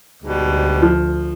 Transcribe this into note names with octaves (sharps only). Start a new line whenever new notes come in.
D2 G#2 B2 G3
F3